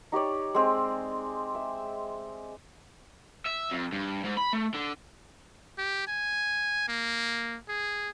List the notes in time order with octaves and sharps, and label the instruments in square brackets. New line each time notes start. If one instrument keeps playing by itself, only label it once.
[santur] D#4 G4 C#5 D5
G#3 C4
E5
[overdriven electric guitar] E5
F2
G2
G#2
B5
A3
D3
[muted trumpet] G4
G#5
A#3
G#4